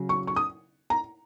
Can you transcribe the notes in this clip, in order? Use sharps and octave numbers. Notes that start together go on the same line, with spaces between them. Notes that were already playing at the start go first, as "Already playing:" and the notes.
Already playing: C#3 F#3
C#6
C#6
D#6
A#5